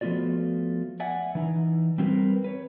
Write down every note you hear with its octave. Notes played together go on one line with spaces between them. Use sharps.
F3 A3 B3 F4 F#4 D5
D5 E5 F#5 G#5
E3 D#4
G3 C4 E4 F4 A#4 B4
B4 C#5